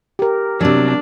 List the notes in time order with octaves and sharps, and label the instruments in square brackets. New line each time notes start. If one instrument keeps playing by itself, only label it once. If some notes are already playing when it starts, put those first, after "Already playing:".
[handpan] G4 A#4
[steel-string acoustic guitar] C3 F#3 [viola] D4